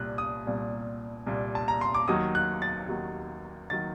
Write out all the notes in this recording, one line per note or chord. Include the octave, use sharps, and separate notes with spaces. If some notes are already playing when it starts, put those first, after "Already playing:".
Already playing: C2 A#2 G3 F#6
D#6
C2 A#2 G3
C2 A#2 G3
A5
A#5
C6
D6
D#2 D#3 F#3 D#6
F#6
A6
D#2 D#3 F#3
D#3 F#3 A6